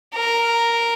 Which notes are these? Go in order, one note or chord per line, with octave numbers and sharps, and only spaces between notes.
A#4